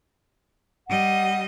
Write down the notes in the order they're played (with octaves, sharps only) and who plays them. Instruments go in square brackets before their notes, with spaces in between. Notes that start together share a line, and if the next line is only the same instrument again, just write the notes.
[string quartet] G3 D#5 [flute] F#5